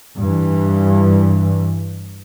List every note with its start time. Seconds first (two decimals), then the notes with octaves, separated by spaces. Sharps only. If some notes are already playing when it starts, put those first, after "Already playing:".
0.18 G2 E3